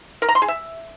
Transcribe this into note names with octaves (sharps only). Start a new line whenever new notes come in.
A#4
A#5
C6
G#4
E5